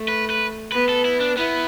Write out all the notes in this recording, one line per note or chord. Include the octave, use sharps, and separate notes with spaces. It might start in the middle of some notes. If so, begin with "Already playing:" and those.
Already playing: A3
B4
B4
B3 B4
A4
E4
D4
B3 E4